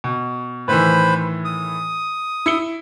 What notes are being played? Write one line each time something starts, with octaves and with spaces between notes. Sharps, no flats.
B2
A2 D#3 E3 B4 C5 B5
D#6
E4 C#7 G7